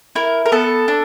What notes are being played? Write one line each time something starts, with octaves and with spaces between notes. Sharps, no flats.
E4 A#4
A#4
B3 A4
D4